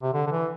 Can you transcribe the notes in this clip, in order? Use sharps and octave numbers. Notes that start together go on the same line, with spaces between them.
C3
D3
D3
E3